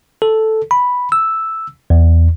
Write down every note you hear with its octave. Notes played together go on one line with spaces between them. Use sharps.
A4
B5
E6
E2